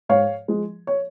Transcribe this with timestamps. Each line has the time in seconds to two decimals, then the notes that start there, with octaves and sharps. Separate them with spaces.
0.09 G#2 C#5 F5
0.48 F3 G#3
0.87 C#5